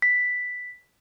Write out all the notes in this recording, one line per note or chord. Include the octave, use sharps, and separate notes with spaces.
B6